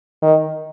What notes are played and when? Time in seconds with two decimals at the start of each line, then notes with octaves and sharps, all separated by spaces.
0.22 D#3